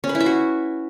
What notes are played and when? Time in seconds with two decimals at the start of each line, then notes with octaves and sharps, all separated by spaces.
0.04 C#4
0.09 B4
0.15 E4
0.20 E5
0.26 F#4